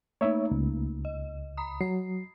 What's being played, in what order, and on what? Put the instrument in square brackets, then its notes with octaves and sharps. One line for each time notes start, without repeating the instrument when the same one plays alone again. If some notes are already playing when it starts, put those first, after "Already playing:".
[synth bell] A3 A#3 D#4 [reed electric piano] C#5 E5
[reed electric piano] C#2
[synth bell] D#5
A#5 B5 D#6
[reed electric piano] F#3 [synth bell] C7